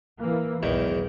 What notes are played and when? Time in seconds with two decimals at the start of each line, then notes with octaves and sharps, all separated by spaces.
0.20 E3 A#3
0.63 B1 E2 G#2 D#3